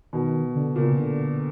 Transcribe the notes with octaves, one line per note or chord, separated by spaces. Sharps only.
B2 D#3
D3
A#2 C#3
D3